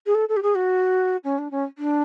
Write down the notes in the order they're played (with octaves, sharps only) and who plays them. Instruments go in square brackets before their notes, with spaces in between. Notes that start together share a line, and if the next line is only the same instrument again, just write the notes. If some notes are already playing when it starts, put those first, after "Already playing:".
[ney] G#4
A4
A4
G4
G#4
F#4
C#4
D4
C#4
D4